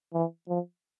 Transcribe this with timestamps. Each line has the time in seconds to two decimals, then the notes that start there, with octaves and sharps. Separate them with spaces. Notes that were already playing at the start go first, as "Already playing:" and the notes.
0.13 E3
0.48 F3